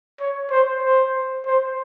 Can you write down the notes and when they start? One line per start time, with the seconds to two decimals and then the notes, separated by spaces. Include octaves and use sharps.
0.20 C#5
0.51 C5
0.83 C5
1.46 C5